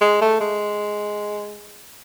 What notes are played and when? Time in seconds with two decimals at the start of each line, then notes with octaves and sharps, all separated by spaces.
0.01 G#3
0.22 A3
0.40 G#3